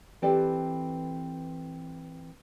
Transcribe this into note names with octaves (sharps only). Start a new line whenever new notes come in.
E3 C4 G4 A4 B4 D5